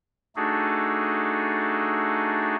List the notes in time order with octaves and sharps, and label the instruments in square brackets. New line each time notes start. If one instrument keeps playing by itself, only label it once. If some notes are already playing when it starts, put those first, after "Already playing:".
[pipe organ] A3 D4 D#4 F#4 G#4 A4